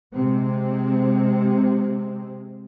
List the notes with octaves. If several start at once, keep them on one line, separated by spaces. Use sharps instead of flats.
C3 G#3 C4